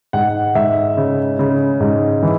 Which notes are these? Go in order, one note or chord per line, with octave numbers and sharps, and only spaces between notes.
G#2 F#5
G#2 E5
C#3
C#3
G#2
E3